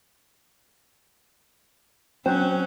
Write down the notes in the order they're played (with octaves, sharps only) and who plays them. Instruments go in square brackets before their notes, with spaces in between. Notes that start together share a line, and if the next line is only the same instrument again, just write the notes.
[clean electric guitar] F#3 [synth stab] C4 [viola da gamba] C#4